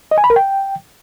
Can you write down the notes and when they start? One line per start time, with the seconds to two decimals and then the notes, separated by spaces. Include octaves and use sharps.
0.11 D#5
0.18 G#5
0.24 B5
0.30 A#4
0.36 G5